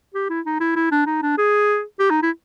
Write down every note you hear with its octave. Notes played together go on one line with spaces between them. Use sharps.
G4
E4
D#4
E4
E4
D4
D#4
D4
G#4
G4
D#4
E4